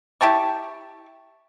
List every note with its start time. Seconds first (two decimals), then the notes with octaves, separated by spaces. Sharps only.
0.21 E4 G4 A5 C#6